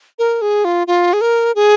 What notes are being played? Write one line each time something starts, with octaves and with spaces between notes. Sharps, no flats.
A#4
G#4
F4
F4
G#4
A#4
G#4